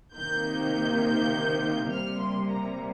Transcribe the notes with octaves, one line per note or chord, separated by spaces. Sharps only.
C3 D#3 A#3 G6
G6
C3 G3 A#3 F6
C6
A#5